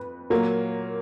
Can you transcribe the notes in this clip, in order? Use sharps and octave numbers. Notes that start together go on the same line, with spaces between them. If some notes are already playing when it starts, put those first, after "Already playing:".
Already playing: F2 B4
A#2 F#3 A#3 A#4